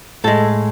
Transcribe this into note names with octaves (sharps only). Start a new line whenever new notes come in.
A2 G#3 A4